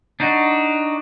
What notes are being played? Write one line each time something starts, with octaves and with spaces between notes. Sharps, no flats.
D4 D#4 F#4